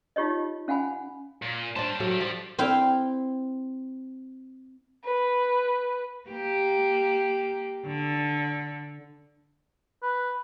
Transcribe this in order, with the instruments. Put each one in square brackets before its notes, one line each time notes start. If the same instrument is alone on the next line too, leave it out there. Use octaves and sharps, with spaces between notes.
[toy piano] D#4 F4 G4 C#5 D#5
C#4 F5 F#5 G#5 B5
[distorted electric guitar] A#2
[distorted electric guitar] G3 A5 [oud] D4 C5
[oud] F#3 F#4 A4
F3
[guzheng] C4 E4 F5 G5
[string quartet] B4
[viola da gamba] A#3 G4
D3
[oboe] B4